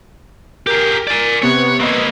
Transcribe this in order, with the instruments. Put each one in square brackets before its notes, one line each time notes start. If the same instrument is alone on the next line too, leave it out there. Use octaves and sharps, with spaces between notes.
[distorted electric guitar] G4 G#4 [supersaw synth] A#4
[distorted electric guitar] D5 G#5
[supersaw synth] C3 B3 F#6 [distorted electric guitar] C#5
[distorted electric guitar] A#3 C4 [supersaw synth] B4 D#5 G#6